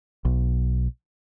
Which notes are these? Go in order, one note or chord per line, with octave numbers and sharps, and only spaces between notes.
B1